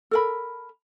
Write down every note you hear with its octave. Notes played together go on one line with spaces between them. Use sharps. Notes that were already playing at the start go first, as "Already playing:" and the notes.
A4 A#4 B5